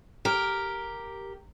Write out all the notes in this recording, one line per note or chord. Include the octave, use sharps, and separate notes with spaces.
G4 A#4